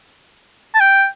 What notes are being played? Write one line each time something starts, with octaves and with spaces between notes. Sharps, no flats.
A5
G5